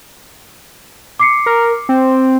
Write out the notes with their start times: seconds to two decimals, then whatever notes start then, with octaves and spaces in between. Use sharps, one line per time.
1.19 D6 C7 C#7
1.46 A#4
1.89 C4